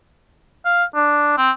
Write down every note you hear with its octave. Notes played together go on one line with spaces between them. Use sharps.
F5
D4
C4